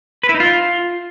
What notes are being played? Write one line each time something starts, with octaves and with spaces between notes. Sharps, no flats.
B4
E4
D#4
F4